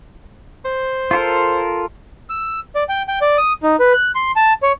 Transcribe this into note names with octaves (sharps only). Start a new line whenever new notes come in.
C5
F4 A4 A#4
E6
D5
G5
G5
D5
D#6
D#4
B4
F#6
C6
A5
C#5